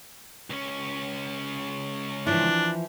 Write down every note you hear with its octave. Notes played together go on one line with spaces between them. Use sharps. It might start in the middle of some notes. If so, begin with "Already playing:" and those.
C#2 C#4
E3 F3 D4 E4